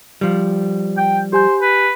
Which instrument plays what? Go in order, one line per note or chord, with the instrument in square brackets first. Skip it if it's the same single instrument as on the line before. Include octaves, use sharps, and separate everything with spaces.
[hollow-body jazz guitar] F3 G3
[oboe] G5
[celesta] G4 G#5 G6 [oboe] C5
[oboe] B4